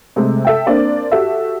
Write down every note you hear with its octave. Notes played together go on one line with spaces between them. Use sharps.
C3 G#3 A3
A4 E5 G5
A#3 C4 D4 D5
F#4 G4 A4 E5